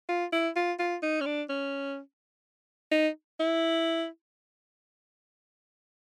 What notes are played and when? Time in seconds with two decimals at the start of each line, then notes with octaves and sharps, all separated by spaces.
0.09 F4
0.32 E4
0.56 F4
0.79 F4
1.02 D#4
1.21 C#4
1.26 D4
1.49 C#4
2.91 D#4
3.40 E4